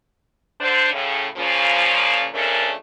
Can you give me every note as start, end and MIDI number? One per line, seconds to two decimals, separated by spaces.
0.61 0.92 50
0.61 0.92 62
0.61 0.92 72
0.92 1.26 45
0.92 1.26 49
1.36 2.27 46
1.36 2.27 49
1.36 2.27 53
2.34 2.71 41
2.34 2.71 49
2.34 2.71 57
2.34 2.71 61
2.34 2.71 62
2.34 2.71 70